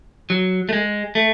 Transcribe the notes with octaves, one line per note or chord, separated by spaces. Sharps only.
F#3
A3
G#3
A3